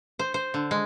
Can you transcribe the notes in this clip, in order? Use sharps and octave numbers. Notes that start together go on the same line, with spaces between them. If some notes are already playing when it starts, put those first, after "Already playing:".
C5
C5
D3
G#3